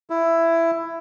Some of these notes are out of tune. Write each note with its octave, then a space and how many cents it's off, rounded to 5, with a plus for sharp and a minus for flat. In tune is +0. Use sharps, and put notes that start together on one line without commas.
E4 +10